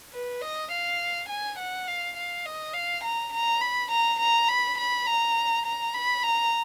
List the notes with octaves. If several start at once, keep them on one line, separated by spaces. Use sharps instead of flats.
B4
D#5
F5
G#5
F#5
F5
F5
D#5
F5
A#5
A#5
B5
A#5
A#5
B5
B5
A#5
A#5
B5
A#5